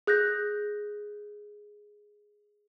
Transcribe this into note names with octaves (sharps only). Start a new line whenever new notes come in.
G#4 F#6 G6 A#6